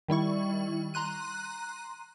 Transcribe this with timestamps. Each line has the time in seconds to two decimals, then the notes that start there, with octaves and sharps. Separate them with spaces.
0.08 D#3 G3 E4 C#6
0.94 A#5 C6 F#6 D#7